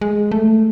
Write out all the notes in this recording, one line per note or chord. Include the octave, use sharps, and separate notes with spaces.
G#3
A3